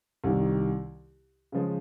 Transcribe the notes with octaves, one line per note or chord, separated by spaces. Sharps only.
C2 C3 D#3
C#3 F3 G#3